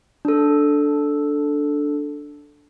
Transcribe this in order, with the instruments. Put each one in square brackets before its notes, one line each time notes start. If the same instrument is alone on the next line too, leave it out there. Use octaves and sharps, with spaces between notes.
[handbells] D4 A4